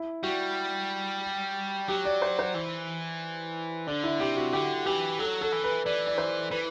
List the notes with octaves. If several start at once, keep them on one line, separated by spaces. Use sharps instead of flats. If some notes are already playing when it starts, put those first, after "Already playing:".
Already playing: E4
G3 F#4
F#3 G4
D5
C5
C5
E3
D3 D4
E4
C3 G4
F#4
D3 G4
E3 G4
F#3 A4
A4
E3
B4
E3 D5
D5
C5
E3 B4